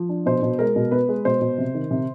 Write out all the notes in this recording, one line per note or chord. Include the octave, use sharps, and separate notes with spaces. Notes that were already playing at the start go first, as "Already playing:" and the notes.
Already playing: F3
D4
B2 C5
B2
G#3 A#4
B2
B3 B4
G#3
B2 C5
B2
C3
D#3
C3